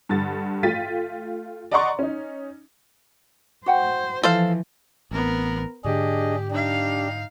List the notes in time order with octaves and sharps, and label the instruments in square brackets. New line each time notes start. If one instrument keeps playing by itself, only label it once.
[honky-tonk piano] G2 D3 A6
A3 F4 G5 A6 B6 D#7
D5 D#5 F#5 A#5 C6 C#6
C#4 D#4
[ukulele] F#4 F#5 G5 [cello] C5
[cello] E3 F3 [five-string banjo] A4 C5 F5
[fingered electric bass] A1 E3 C4 [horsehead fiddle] B3 A#4
[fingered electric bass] G#2 D3 [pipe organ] D4 G#4 D#5 [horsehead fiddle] G4
[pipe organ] D4 G4 [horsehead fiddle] D#4 F5